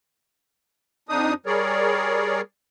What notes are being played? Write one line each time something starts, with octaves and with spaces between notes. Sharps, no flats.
F2 D4 D#4 D#6
G3 G#4 A#4 C#5 D5